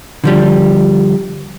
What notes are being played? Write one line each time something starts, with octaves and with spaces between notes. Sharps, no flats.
D3 F3 G3